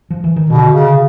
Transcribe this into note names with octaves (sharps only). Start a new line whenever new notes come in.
F3
E3
D#3
B2 D3
C#3